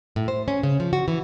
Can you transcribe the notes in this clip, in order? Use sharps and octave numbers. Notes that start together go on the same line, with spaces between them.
A2
C5
C#4
C#3
F3
F#4
E3